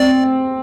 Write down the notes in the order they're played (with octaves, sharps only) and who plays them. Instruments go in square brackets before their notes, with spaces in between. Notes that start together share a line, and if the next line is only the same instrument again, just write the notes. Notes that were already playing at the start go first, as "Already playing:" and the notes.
Already playing: [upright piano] C4 [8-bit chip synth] D5